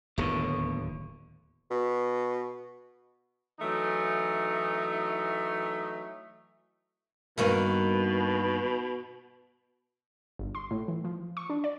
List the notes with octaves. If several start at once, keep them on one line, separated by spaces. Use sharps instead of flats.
D1 D#2 A2 D3 B3 C#5
B2
E3 F#3 A3 D#4
G2 B2 D#3 A#3 B4 C#6
G1
C6
A2
E3
F3
C#6
D4
D5